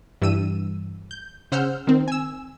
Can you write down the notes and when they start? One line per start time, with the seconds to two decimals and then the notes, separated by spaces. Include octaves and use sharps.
0.22 G2 E3 E6 D#7
1.11 G6
1.52 C#3 C5 F#5 E6 F6 G6
1.87 D#3 C4
2.08 G#5 E6